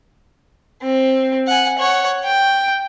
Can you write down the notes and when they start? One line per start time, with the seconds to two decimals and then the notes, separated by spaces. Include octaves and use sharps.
0.82 C4
1.47 F#5 G#5
1.78 C#5 F#5
2.25 G5